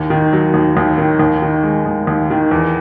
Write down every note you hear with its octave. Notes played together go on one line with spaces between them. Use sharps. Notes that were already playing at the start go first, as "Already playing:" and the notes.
Already playing: D#2
D#3
F#3
D#2
D#2
D#3
D#2
D#3
G#3
D#2
D#2
D#3
E2